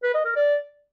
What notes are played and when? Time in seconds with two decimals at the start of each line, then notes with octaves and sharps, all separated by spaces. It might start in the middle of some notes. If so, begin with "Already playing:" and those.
0.03 B4
0.14 D#5
0.25 A#4
0.36 D5